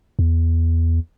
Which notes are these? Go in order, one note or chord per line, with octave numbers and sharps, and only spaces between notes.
E2